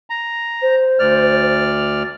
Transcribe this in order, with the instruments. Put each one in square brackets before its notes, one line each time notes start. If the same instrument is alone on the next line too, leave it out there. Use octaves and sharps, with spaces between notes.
[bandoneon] A#5
[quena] C5
[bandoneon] D2 D5 F6